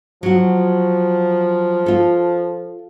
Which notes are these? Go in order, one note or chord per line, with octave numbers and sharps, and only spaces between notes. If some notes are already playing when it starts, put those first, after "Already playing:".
F3 F#3 F#4
F4 A4